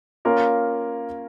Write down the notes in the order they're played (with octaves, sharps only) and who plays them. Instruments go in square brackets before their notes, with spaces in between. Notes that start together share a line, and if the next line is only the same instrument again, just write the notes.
[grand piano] A#3 C#4 F4 A#4